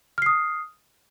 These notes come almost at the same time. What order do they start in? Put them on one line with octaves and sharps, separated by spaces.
F6 C7 D#6